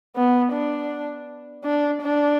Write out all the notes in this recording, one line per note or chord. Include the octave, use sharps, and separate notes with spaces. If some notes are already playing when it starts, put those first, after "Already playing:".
B3
D4
D4
D4